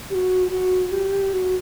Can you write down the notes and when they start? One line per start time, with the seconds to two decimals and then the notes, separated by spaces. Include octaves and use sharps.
0.10 G4
0.15 F#4
0.51 F#4
0.92 G4
1.33 F#4